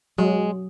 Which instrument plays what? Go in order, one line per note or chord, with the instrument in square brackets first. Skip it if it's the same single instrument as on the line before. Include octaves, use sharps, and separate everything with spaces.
[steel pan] F#3 [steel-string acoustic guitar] G#3